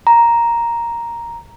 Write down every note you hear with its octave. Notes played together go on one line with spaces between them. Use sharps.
A#5